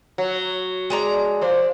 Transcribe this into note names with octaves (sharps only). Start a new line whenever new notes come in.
F#3
G#3 D4 A#5
F3 C5 D5